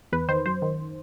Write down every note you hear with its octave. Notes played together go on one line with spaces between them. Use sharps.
E2 B4
D#3 C5
F#2 C5
D#3